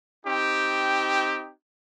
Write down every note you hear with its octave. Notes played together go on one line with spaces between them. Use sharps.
C4 D#4 G4